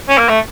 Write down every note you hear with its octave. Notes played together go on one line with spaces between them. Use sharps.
C#4
A#3
A3